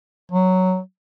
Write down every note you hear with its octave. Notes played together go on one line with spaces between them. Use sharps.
F#3